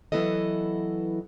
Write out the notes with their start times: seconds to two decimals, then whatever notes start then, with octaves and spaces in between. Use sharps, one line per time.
0.12 E3 F#3 B3 E4 A4 D#5